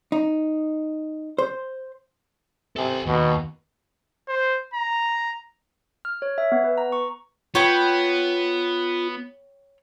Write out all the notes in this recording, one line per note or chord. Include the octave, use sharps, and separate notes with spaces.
D#4
C5
C3 A4 G#5
D#2 B2
C5
A#5
F6
C#5
E5
B3
B4
A#5
C#6
B3 F4 C#5 G5 B5